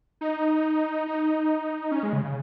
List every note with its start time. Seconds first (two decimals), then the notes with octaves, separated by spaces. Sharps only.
0.21 D#4
1.07 D#4
1.92 C#4
2.03 G#3
2.13 C#3
2.24 C#3